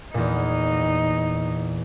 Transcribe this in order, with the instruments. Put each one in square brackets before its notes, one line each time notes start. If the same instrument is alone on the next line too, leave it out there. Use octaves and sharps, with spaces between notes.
[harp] E2 A#2 [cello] D#4